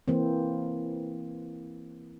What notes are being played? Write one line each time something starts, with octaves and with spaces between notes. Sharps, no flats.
E3 A#3 C4